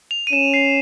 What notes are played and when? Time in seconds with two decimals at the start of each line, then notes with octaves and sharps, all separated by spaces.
0.11 F7
0.27 D#7
0.32 C#4 E7
0.54 C7